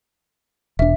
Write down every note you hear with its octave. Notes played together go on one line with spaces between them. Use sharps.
E1 D4 E5